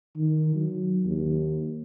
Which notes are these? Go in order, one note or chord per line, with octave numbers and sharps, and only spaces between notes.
D#3
F#3
D#2